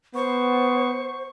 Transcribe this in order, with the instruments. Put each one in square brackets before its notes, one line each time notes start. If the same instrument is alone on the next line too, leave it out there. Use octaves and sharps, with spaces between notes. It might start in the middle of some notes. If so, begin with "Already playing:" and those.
[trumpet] B3 [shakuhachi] C5 [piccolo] C#6